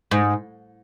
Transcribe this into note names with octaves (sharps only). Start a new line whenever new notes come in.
G#2